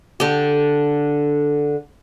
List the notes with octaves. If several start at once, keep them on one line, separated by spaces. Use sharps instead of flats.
D3 G4